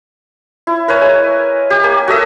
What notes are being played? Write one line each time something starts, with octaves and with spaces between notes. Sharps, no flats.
E4
A#4 B4 C#5 G#5
G#3
G4
A#3 G#5
F#4 A4 D#5 E5